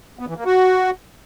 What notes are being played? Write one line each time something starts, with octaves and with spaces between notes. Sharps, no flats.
B3
E3
A#3
F#4